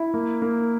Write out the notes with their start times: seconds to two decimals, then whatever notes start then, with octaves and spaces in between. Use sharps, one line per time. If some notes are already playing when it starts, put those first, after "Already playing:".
Already playing: E4
0.14 A#3
0.42 A#3